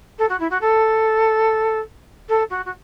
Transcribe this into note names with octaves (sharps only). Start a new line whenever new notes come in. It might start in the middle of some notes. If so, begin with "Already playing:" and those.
A4
F#4
E4
F#4
A4
A4
F#4
F#4